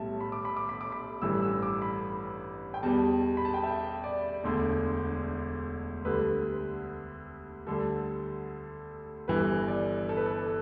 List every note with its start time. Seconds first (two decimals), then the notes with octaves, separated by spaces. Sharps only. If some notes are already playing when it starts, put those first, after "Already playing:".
Already playing: B1 A2 G3 E5 A5
0.21 B5
0.32 D6
0.45 B5
0.57 D6
0.69 B5
0.81 D6
0.92 B5
1.22 A1 G2 E3 G3 E6
1.42 E6
1.63 D6
1.82 B5
2.74 G5
2.83 E2 B2 G3 A5
3.37 B5
3.45 A5
3.54 G5
3.63 E5
4.04 D5
4.44 E1 D2 D3
6.05 D2 D3 G3 B4
7.67 D2 D3 G3 A4
9.28 G1 G2 E3 G3 B4
9.68 D5
10.09 A4
10.17 B4
10.26 A4